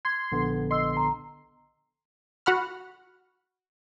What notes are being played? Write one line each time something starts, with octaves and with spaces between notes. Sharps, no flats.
C6 G#6
A#1 D3 B3
D#5 C6 E6
A#5
F#4 F#5 B5 F6